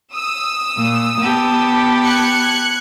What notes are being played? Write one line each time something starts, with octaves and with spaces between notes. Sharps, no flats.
D#6 E6
A#2
B3 G4 A5
F#6 G#6 C#7